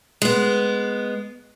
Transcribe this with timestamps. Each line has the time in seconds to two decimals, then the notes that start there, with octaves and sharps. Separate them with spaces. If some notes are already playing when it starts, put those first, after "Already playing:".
0.22 G#3 B3